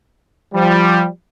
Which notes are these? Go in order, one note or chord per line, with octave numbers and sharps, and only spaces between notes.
F3 G3